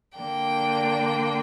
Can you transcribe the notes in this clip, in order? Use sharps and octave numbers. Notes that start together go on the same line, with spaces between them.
D3 A#3 D4 G5